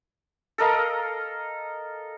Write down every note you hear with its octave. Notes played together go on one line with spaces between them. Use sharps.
A4 A#4 D#5 F5